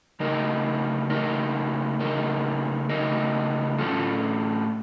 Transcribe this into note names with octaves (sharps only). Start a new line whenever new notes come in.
C#3 A3 D#4 A#4 D#5
C#3 A3 D#4 A#4 D#5
C#3 A3 D#4 A#4 D#5
C#3 A3 D#4 A#4 D#5
A2 A3 C#4 F4 A4